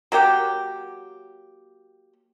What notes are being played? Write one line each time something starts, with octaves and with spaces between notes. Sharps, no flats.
F#3 A#3 G4 F#5